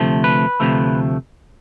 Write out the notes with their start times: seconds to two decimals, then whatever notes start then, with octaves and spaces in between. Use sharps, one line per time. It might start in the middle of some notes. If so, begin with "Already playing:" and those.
Already playing: D2 C3 F3 A3
0.24 B4
0.60 D2 C3 F3 A3